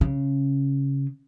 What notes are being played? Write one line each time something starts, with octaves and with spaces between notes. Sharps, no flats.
C#3